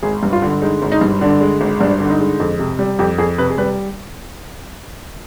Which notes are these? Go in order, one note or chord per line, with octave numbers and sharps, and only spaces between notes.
G#1 G#4
G2
F4
D3
G#3 D#4
G#1
D#4
G2
D3 D4
G#3
G#1
G2 D4
D3
D#4
G#3
F2
C3
G3
F2 G4
F2 G#4
C3 B4
G#4
G3 B4